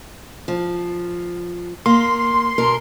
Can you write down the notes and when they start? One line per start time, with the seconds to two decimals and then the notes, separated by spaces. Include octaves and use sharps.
0.48 F3
1.86 A#3 C6
2.58 B2 A#4